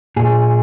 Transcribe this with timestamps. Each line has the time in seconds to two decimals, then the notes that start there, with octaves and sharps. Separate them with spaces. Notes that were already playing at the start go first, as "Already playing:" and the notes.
0.16 A#2 G#4